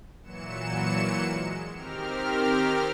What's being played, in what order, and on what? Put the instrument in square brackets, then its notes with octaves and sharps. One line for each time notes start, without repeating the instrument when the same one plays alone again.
[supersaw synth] A#2 E3 F#3 C#7 E7
G#3
D#3 C4 G4 A#4 F6